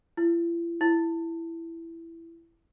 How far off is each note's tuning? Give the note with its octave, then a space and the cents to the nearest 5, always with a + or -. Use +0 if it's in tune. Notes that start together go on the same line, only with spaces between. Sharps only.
E4 +45
E4 +10